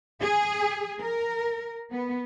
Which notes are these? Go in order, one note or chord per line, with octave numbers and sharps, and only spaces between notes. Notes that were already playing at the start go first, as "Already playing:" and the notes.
G#4
A#4
B3